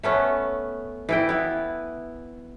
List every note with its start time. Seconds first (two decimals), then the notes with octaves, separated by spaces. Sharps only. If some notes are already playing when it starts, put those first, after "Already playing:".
0.03 A3 B3 C#4
1.09 E3 E4 G5
1.29 B3 E4